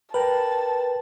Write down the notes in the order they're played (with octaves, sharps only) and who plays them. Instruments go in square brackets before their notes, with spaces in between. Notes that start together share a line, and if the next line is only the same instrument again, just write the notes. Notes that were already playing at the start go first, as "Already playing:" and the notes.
[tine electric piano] A#4 G5 A#5 [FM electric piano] B4 [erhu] A5